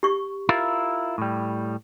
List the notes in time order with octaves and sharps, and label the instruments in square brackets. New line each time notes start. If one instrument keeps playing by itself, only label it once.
[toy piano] G4 C#6
[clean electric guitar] E4 F4 A#4
A2 G3